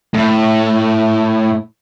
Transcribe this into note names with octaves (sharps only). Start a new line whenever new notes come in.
A2